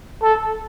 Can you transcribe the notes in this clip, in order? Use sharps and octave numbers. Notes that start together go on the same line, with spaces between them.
A4